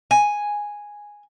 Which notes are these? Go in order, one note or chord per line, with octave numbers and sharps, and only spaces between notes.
G#5